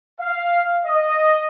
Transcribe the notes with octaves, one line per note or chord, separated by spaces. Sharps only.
F5
D#5